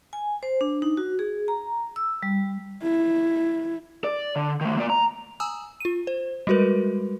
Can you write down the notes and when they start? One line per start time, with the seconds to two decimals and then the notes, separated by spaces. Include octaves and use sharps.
0.13 G#5
0.43 C5
0.61 D4
0.82 D#4
0.97 F#4
1.19 G#4
1.48 A#5
1.96 E6
2.23 G3
2.83 E4
4.04 D5
4.36 D3
4.61 D#3 A3
4.77 A#3 D5
4.90 A#5
5.40 G#5 A#5 D#6 E6
5.80 F4 D#7
6.07 C5
6.47 G3 G#3 F#4 A#4 B4